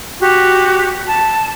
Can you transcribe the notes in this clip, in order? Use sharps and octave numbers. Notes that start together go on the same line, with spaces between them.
F#4 G4
A5